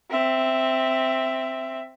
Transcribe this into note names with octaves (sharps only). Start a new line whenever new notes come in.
C4 E5